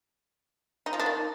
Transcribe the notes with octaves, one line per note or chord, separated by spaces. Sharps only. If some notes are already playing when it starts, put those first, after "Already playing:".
D#4
F3
D4
D#3